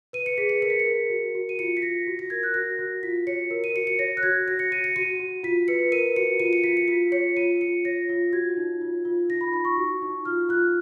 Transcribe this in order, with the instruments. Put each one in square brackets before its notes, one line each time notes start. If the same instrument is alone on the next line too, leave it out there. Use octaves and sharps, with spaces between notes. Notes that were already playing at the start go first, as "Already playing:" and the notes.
[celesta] B4 D#7
C#7
G#4 B6
C#7
A#4 C#7
B6
C#7
A#4
F#4
F#4
D#7
F4 C#7
B6
F4 A#6
F#4
A#6
A#4 G#6
F#6
F#4 A#6
F#4
F4 B6
C#5 C#7
A#4
D#7
F#4 C#7
C#7
C#5 A#6
F#6
F#4 G#6
F#4 A#6
C#7
F#4 D#7
C#7
F#4 D#7
F#4
F4 B6
B4 C#7
A#4 D#7
F#4 C#7
F4 D#7
C#7
F4 B6
C#7
F4 B6
C#5 C#7
F4 D#7
F4 C#7
C#5 A#6
F4
F#4 G#6
D#4
F4
F4
D#4 A#6
B5
D#4 B5
C#6
F#4
D#4
F4 F6
F4 F#6